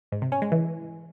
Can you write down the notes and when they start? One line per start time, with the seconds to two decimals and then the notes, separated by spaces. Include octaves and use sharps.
0.12 G#2
0.22 C3
0.32 C#4
0.42 G#3
0.52 E3